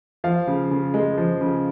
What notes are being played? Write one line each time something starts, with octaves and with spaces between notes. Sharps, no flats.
F3 F5
C#3
C#3
G#3
F3
C#3